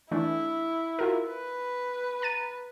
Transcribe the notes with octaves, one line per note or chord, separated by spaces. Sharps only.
E3 A3 D4 E4
F4 F#4 A#4
B4
A#5 A6 D#7